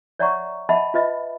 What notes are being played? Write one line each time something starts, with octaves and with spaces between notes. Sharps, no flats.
C#5 D5 E5 F#5 A#5 C#6
D#5 E5 F#5 A5 B5
F4 B4 D#5 E5